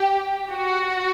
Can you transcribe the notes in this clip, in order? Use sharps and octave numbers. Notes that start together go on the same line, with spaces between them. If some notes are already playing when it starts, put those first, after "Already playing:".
Already playing: G4
F#4